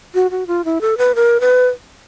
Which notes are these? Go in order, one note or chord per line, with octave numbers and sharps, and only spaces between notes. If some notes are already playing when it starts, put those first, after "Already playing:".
F#4
F#4
F4
E4
A4
B4
A#4
B4